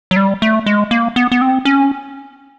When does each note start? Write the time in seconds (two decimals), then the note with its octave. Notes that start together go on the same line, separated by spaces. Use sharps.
0.11 F#3
0.16 G3
0.42 A3
0.66 G#3
0.91 A#3
1.16 B3
1.32 B3
1.41 C4
1.65 C#4